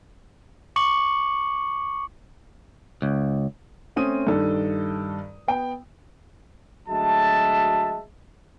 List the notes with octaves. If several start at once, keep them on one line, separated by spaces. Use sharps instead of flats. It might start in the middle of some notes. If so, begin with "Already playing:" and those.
C#6 D6 C#7 F#7
C#2
A3 C4 C#4 D#6 D#7
G2 D#3 A4
B3 G5
D2 F#3 G#3 E5 A5